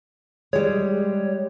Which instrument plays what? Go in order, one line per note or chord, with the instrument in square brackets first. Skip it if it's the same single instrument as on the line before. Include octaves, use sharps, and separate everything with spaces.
[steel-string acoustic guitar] G3 G#3 [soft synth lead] C#5